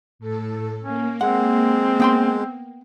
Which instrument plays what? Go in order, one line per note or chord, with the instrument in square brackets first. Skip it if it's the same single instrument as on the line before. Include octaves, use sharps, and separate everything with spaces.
[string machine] A2 A4
[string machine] A#3 [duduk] C#4
[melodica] G#3 [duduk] C4 [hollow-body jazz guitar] F#5
[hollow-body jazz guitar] B3 G5 C6